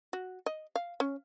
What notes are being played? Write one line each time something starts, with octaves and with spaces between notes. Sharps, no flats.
F#4
D#5
F5
C#4